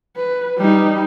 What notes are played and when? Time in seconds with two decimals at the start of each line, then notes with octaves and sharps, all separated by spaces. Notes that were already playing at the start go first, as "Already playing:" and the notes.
0.16 B4
0.58 G3 D#4